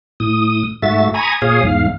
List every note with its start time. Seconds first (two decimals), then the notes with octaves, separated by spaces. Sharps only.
0.20 A2 D#6
0.82 G#2 A3 F#4 E5 A6
1.14 G#5 A#5 B5 C#6 D#6 G#6
1.42 A#2 G#4 C#5 F5 D#6
1.63 E2 G#2 F5